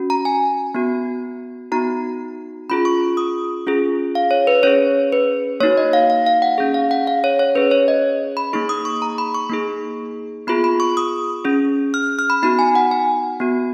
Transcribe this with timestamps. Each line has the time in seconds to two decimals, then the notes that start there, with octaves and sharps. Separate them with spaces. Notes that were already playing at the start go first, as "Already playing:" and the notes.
Already playing: C#4 F#4
0.10 A#5
0.25 G#5
0.75 B3 F#4
1.72 B3 D#4 F#4 A#5
2.70 C#4 F4 G#4 B5
2.85 C#6
3.17 D#6
3.66 C#4 F4 G#4
4.15 F5
4.31 C#5
4.47 B4
4.63 C#4 G#4 C#5
5.12 B4
5.60 A#3 C#5
5.63 D#4 F#4
5.77 D#5
5.93 F5
6.10 F5
6.26 F5
6.42 F#5
6.58 C#4 G#4
6.74 F5
6.91 F#5
7.07 F5
7.24 C#5
7.39 C#5
7.55 C#4 G#4 B4
7.71 C#5
7.88 D#5
8.37 B5
8.53 A#3 D#4 G#4 C#6
8.69 D#6
8.85 C#6
9.02 A#5
9.18 B5
9.34 C#6
9.50 A#3 D#4 G#4
10.47 B3 F4 G#4 B5
10.64 B5
10.80 C#6
10.97 D#6
11.45 C#4 G#4
11.94 F6
12.19 F6
12.30 B5
12.43 B3 D#4 F#4 B5
12.59 G#5
12.75 F#5
12.91 G#5
13.40 B3 F#4